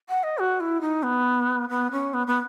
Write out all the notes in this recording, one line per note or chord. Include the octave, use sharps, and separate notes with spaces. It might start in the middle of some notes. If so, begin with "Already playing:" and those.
F#5
D#5
F#4
E4
D#4
B3
B3
C#4
B3
B3